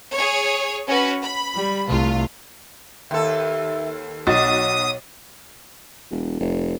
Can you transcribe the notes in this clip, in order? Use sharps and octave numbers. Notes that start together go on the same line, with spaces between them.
G#4 C#5
C#4 F#4 B4
B5
G3
C2 A3 F4
D#2 A4 E5
B1 F#4 C#5 D#6 A6
E1
F1